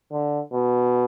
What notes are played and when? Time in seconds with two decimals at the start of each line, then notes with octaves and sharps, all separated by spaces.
0.12 D3
0.53 B2